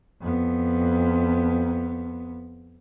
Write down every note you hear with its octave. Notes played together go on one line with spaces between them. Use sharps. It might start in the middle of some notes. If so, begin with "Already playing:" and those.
F2 B3